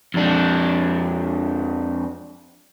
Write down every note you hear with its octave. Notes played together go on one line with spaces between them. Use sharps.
F2 D4